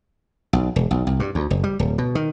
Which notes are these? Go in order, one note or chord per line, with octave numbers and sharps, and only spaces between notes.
B1
E1
B1
C2
G2
D2
F#1
G3
D1
B2
D#3